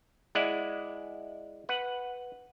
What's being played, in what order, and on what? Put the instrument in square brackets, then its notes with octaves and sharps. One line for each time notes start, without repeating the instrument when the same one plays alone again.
[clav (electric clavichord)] G#3 E4 D5 F#5
B4 F#5